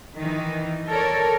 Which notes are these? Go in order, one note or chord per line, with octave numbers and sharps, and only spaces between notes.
D#3 E3 D#4
A4 A#4 C#5 D5